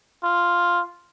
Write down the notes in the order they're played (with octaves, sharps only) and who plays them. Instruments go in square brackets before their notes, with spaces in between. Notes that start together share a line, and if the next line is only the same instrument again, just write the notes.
[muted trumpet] F4